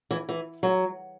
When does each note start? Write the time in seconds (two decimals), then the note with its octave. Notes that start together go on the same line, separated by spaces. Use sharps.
0.11 E3
0.29 E3
0.63 F#3